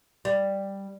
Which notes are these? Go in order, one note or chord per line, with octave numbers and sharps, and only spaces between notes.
G3